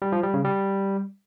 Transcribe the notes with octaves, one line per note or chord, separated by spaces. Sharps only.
G3
F3
G3
C#3
G3